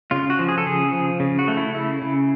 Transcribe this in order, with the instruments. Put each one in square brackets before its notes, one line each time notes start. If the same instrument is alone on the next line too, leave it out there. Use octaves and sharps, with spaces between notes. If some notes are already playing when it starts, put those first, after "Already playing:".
[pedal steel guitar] C#3 F4
F#4
F3
G#4
A4
C#3 G#4
F3
C#3
F#4
A3
E4
C#3 E4
C#3